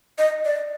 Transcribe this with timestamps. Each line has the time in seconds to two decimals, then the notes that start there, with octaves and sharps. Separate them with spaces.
0.18 D#5
0.45 D5